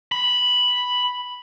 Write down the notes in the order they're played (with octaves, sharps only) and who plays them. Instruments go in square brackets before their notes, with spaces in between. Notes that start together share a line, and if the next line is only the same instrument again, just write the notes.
[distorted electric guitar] B5